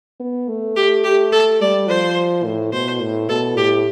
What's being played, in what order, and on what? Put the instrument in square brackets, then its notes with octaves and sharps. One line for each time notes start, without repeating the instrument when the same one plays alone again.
[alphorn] B3
A3
[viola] G4
G4
A4
[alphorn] G3 [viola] D5
[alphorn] F3 [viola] C5
[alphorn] A2
[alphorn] B2 [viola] C5
[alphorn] A2
[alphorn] B2 [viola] A4
[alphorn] A2 [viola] G4